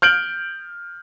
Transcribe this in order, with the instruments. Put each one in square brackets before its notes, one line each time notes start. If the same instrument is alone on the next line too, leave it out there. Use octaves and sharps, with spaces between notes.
[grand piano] F6 G6 D7 F#7